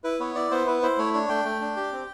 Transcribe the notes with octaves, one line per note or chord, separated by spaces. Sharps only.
E4 B4
B3 C#5
E4 D5
B3 C5
E4 B4
E4 C5
A3 C#5
D4 C#5
A3 G5
A3
D4
G4
C4